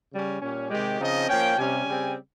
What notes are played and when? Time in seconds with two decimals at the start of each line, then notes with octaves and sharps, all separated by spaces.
0.12 C#3 G3 C#4
0.41 A#2 G3 C#4
0.70 C3 D#3 G#3 G4
0.99 C#3 F3 C4 D#4 D#5
1.28 F3 A#3 C#4 G5
1.58 C3 G3 C#4 G#5
1.87 C#3 G3 C4